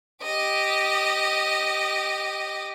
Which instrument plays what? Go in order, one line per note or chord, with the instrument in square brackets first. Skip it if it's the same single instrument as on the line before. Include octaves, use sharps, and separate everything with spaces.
[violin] G4 D#5